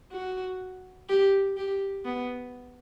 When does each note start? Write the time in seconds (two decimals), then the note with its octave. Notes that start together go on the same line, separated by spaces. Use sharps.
0.12 F#4
1.09 G4
1.58 G4
2.06 B3